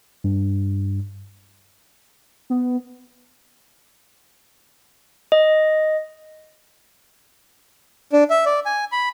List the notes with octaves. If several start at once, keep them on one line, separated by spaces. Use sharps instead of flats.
G2
B3
D#5
D4
E5
D5
G#5
B5